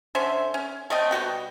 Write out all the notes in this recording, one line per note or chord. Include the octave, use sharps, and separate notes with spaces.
D3 C#4 C5 E5
C#4
A3 C4 D#5 G5
B2 G3 F#4 G5